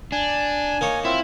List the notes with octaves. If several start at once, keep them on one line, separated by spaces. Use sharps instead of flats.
D4 G#5
A#3 D#4 C#5
C4 E4 F4